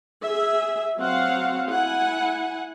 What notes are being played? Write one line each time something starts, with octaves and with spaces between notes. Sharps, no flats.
G#4 E5
F#3 C4 F5 F#5
E4 F#5 G#5